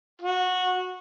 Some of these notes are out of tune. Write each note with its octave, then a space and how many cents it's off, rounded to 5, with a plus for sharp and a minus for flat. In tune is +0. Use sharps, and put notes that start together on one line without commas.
F#4 -15